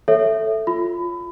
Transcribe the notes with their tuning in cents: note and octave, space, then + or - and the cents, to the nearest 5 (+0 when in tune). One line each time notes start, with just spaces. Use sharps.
A4 +0 C#5 +0 E5 +0
F4 +0 B5 +25